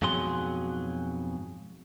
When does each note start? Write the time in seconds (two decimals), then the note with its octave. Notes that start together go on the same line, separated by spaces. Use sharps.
0.02 F2 G#2 B2 F#3 G#4 C6